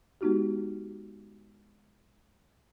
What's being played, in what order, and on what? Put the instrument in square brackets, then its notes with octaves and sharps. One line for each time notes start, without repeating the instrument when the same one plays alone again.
[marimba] G#3 B3 D#4 F#4 G4